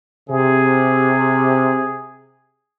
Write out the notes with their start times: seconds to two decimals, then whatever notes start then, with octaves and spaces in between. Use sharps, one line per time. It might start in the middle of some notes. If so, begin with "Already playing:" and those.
0.29 C3 G#4